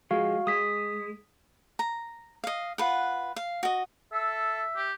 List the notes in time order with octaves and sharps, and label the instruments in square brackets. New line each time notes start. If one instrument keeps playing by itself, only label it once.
[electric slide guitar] F3 G#3 [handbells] F#4 F5
[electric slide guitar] G#3 [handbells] D#6 B6
[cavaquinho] A#5
D#5 F5
F4 B4 F#5
F5
F#4 D#5
[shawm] A4 [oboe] E5
[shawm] G4